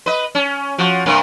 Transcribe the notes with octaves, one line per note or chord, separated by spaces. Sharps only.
B4 D#5
C#4
F3 F#4
G2 C3 A#3